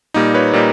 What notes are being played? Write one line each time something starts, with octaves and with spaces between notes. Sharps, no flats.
A#2 G3 A#3 D#4
B4 C#5
A#2 G3 A#3 D#4